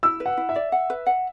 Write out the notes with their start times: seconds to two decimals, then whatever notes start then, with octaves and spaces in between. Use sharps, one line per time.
0.03 E4 E6
0.20 B4
0.26 F#5
0.37 E4
0.49 E5
0.56 D5
0.72 F#5
0.90 B4
1.06 F#5